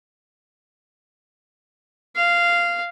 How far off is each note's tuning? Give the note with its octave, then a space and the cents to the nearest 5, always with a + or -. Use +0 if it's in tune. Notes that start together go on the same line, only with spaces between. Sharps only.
F5 -10